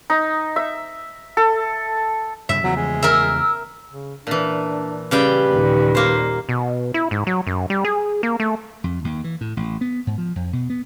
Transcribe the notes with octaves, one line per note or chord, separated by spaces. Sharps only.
D#4
E5
A4
G2 C#3 E5
E2 C#3 F3 F#3
G#3
A#4 E5 E6
C#3
A#2 E3 D4
C#3 G3 B4 G5
D#2 A#2
A#3 C5
B2
E4
G#2
F#3
F#2
G3
G#4
A#3
A3
F2
D#2
E3
A2
A1
B3
G#2
F3
F2
B2
B3